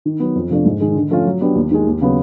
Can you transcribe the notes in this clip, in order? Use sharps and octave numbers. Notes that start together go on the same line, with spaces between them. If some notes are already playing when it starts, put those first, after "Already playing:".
D#3
F#3 B3
F2
C3 F3 A3 D4
G#2
D#3 G#3
D3
F3 A3 C#4 F4
F#3
B3 D4 G4
D#2
D#3 G#3
D#2
C#3 F#3 B3